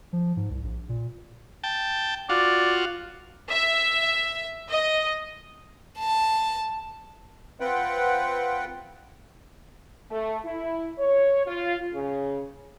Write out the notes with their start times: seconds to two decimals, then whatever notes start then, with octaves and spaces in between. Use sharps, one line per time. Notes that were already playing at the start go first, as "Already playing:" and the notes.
0.13 F3
0.36 G#2
0.50 C2
0.63 A#1
0.89 A#2
1.64 G5 A5
2.29 F4 F#4 D5
3.51 E5
4.69 D#5
5.99 A5
7.60 C4 F4 B4 F#5 G5
10.11 A3
10.45 E4
10.98 C#5
11.46 F4
11.93 C#3